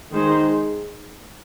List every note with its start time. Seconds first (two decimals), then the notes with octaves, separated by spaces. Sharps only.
0.12 D#3 G#3 D#4 G#4 C5